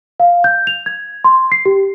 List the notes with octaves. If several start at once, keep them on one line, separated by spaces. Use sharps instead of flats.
F5
G6
F7
G#6
C6
C7
G4